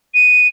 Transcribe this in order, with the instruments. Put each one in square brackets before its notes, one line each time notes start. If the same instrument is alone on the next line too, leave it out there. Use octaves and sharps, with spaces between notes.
[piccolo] D#7